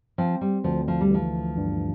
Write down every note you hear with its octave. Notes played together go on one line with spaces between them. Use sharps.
F3 C4
G3
D2 F3
F3
G3
E3 F3
G2